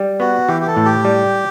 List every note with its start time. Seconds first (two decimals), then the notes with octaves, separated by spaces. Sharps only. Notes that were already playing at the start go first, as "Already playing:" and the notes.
Already playing: G3
0.20 B3 F#4
0.48 E3 G4
0.62 G4
0.67 A4
0.76 A2
0.85 G4
1.05 G3